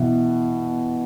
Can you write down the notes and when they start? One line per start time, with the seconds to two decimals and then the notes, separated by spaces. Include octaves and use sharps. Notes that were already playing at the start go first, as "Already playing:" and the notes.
Already playing: B2 E3